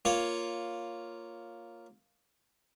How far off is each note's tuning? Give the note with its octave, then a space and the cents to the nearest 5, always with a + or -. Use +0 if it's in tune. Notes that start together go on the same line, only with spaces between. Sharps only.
A#3 +0 F4 +0 C#5 +0